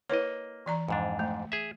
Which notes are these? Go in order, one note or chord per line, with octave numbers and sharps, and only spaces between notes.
A#3 E4 B4 C#5 D#5
E3 D5 A#5
F2 G#2 D4
A3
G#4 E5